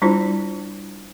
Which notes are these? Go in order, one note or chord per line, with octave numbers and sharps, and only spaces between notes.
G3 D4 E4 F4 C5